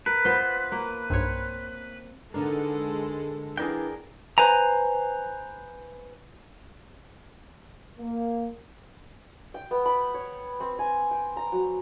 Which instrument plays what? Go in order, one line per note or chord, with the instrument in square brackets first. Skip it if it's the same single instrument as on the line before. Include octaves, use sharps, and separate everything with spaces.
[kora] A#4 [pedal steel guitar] B4
[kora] B3 F4 C5 [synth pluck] C6
[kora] A#3
[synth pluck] B1 G2 [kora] C4 C#5
[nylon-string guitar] D3 B3 A#4 [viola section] G#3 A4 [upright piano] D4 D#4
[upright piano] E3 B3 D4 [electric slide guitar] G#4 A#4 G5
[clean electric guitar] B4 C5 G#5 A#5
[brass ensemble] A#3
[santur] G5
B3
B5
C#5
C4
G#5
G5
A#5
F#3